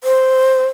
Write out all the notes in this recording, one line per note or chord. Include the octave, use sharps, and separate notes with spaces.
C5